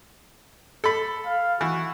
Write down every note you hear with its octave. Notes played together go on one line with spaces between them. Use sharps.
A4 B5
F5
E3 F#4